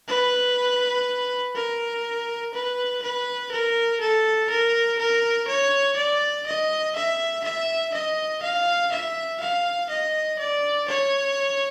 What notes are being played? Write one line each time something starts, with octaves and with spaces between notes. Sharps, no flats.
B4
A#4
B4
B4
A#4
A4
A#4
A#4
C#5
D5
D#5
E5
E5
D#5
F5
E5
F5
D#5
D5
C#5